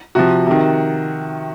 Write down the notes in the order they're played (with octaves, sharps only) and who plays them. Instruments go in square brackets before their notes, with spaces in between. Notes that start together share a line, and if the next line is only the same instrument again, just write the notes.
[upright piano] C3 F3 F#4
C3 D#3